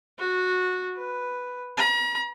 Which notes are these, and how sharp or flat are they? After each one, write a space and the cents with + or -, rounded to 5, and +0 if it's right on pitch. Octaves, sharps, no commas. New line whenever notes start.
F#4 -15
B4 +0
A#5 +45